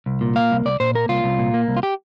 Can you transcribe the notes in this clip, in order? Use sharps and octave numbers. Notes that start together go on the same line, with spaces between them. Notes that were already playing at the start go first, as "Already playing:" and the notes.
C2
A#2
A#3 F5
C2
C2 D5
A#2 C5
A#3 A#4
C2 F4
C2
A#2
A#3
C2
F4
G4